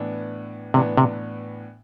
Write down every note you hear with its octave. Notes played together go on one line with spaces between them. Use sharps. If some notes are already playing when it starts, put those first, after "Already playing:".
Already playing: A2 E3 B3 D4
A2 C3 E3 B3 D4
C3